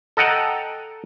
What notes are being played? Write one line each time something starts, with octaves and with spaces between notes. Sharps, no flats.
A4 D#5 F#5 G5 A#5